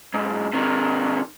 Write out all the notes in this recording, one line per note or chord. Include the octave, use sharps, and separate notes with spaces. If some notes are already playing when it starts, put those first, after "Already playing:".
B1 G#2
C3 D#3